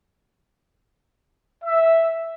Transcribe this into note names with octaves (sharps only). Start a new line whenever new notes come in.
E5